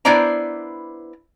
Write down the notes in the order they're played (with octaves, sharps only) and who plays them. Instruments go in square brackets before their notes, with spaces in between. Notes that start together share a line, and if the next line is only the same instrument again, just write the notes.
[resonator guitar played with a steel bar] B3 D4 E4 C5 D5 A#5